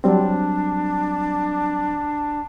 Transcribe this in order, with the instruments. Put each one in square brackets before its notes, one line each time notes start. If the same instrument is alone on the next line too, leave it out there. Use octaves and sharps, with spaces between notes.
[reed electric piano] F#3 G3 C4 [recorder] D4